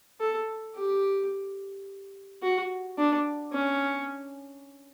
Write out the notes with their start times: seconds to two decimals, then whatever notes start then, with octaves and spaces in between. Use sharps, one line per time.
0.20 A4
0.75 G4
2.42 F#4
2.97 D4
3.52 C#4